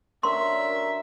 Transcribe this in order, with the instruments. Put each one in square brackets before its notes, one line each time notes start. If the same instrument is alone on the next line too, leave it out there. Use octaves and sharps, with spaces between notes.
[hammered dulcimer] D3 C#4 F#4 [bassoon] A#4 [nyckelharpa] E5 [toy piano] C6